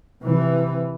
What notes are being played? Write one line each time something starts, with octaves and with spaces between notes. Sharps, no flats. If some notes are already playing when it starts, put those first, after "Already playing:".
C3 E3